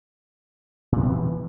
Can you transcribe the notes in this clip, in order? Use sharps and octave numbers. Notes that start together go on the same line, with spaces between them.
A#2
B3
C3
E3